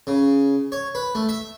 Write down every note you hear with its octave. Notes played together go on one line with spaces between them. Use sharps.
C#3
C#5
B4
A3
E5